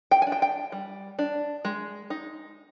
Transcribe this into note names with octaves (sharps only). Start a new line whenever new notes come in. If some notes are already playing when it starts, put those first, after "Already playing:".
G5
G#5
D4
G5
G5
G3
D4
G#3
D#4